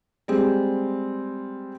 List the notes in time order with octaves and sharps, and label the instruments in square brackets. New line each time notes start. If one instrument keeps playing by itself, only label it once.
[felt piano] G3 G#3 C4